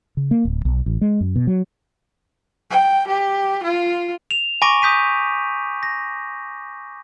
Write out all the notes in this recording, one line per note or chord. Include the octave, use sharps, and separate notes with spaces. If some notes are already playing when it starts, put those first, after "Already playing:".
C#3
A#3
D1
B1
A1
G#3
F#2
B2
F#3
G5
G4
F4
E7 F7
G#5 B5 C#6 D6 A#6 D7
D#6 G6 B6 D#7
A#6